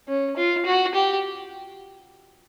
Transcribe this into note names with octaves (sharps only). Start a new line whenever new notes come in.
C#4
F4
F#4
G4